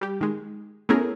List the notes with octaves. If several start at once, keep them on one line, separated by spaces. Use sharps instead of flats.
G3 G4
D#3 G#3
A3 B3 C#4 E4 G#4 A#4